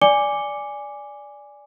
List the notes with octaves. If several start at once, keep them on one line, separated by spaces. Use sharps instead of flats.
D5 G#5 D6 C#7 G7